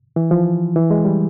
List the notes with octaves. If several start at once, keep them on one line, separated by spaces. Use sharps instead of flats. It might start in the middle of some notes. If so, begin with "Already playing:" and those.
E3
F3
E3
G#3
G3